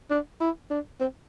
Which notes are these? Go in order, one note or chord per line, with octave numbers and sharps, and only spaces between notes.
D4
E4
D4
C4